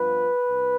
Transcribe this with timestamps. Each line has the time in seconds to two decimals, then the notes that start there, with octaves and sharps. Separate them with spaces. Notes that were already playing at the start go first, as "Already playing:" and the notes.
Already playing: G2 F3 B3 B4
0.46 C2